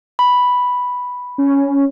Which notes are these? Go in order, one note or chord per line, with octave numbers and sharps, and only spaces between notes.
B5
C#4